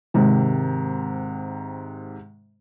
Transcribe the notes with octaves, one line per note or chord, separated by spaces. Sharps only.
G#2 C3 D#3